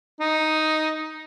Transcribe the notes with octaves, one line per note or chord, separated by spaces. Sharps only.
D#4